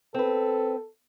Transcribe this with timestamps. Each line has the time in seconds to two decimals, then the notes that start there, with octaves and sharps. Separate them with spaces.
0.14 C4 A4 B4